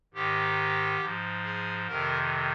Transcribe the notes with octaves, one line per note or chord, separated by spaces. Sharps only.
G#2 D#3 G4
G#2 F3
G#4
F2 C3 D#3 A#4